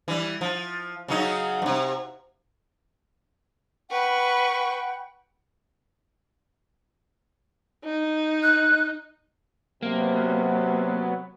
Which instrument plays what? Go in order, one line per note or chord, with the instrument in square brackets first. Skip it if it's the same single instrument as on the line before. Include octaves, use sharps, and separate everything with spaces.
[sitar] E3 G3
F3
C#3 F#3 D#4
G2 C3
[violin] B4 C#6 [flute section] F#5 G5 B5
[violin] D#4
[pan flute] F#6
[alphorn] C3 [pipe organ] F#3 B3 [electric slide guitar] A#3